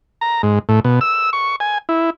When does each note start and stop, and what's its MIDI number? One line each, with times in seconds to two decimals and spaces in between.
0.21 0.42 82
0.43 0.59 44
0.69 0.80 45
0.85 0.99 47
1.01 1.30 88
1.33 1.56 85
1.60 1.78 80
1.89 2.10 64